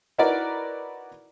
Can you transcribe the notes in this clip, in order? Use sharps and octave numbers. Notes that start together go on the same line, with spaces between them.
D#4 E4 F#4 A#4 B4 D5